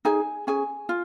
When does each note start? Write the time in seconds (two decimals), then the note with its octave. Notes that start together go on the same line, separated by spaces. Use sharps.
0.05 D#4 G#4 G#5
0.47 C#4 G#4 G#5
0.89 F4